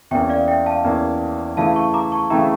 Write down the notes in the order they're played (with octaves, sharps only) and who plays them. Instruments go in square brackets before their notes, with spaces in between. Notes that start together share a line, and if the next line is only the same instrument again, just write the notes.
[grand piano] E2 E3 A#3 C#4 [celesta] E5 G5
[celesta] D5 F5
E5 G5
F5 A5
[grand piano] E2 E3 A#3 C#4
[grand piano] C#3 E3 A3 E4 [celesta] F5 A5
[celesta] A5 C#6
A#5 D6
A5 C#6
[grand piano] C#3 E3 A3 E4 [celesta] G5 A#5